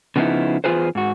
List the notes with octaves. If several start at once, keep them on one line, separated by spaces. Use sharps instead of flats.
C#3 F3 B3 C4 D#4 E4
E2 G3 F4 G#4 B4 C5
G#2 F#4